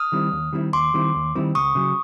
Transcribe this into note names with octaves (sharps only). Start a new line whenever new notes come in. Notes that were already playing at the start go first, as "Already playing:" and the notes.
Already playing: D#6 F6
D#3 G3 C4 E4
D#2
D#3 G3 C4 E4
D#2 C6 D6
D#3 G3 C4 E4
D#2
D#3 G3 C4 E4
C#2 C#6 D#6
C#3 F#3